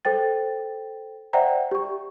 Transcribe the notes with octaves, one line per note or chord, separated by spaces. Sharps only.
A4 C5 G5 A6
C5 D5 E5 F#5 G5 A#5
G4 C#6